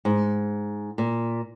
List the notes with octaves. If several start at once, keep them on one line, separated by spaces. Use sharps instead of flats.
G#2
A#2